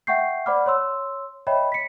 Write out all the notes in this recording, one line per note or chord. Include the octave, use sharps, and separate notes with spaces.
E5 F#5 G5 C#6 G6 C7
C5 D5 F#5 B5 D6 F6
C#5 C6 E6
C#5 D#5 E5 G5 B5
B6 C#7